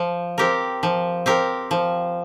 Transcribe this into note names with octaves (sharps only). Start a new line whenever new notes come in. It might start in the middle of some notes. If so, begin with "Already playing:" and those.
Already playing: F3
C4 G4 A#4
F3
C4 G4 A#4
F3